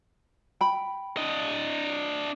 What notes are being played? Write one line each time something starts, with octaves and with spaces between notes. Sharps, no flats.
G5 B5
D4 D#5